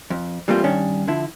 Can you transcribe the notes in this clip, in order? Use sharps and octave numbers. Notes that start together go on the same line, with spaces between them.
F2
E3 G3 A3 A#3 C4 F4
G2 D#3 C#4 D4
D3 F3 E4